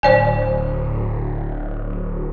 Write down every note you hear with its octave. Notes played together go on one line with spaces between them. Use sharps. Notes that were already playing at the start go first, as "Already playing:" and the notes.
D1 C5 D5 G#5